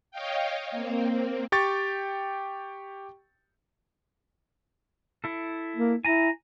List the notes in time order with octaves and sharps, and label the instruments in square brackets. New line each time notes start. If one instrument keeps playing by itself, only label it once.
[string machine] C#5 D#5 F5 G5
A#3 C4
[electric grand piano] G4 G5 C#6 A6
[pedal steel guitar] E4 A4
[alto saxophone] A#3
[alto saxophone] E4 [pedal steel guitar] G#5 A#5